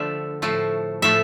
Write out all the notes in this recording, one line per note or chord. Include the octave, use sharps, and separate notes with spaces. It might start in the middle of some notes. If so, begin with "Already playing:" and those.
Already playing: D3 F3 A3 E5
A2 F3 A3
A2 F3 A3 E5